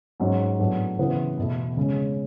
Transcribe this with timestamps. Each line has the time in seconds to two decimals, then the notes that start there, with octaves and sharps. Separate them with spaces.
0.20 G#2 F#3 C#4
0.59 A2 F#3 B3 D4
0.99 C#3 E3 B3 E4
1.37 E2 B2 A3
1.77 C#3 G#3 C#4